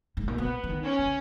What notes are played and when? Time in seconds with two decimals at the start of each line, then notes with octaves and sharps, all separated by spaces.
0.17 G#2
0.28 A#2
0.38 B2 B3
0.64 E3
0.69 D#3
0.84 C#4
0.99 C#3